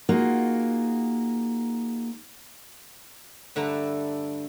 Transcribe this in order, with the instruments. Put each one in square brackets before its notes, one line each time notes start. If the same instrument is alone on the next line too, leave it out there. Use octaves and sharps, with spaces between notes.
[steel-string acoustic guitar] A#3 D#4 F4 F#4 G#4
[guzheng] G2 D3 A3 B4 E5 A#5